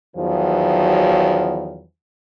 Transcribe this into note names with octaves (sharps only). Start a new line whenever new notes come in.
E2 D#3 F3 F#3